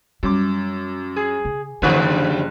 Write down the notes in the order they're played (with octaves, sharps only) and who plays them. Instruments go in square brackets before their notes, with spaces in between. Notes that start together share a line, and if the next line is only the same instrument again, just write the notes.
[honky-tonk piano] F#2 D6 [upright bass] G3
[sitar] G#4
[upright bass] C#3
[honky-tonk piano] F#1 F#6 [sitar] G2 D3 F3 [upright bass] E4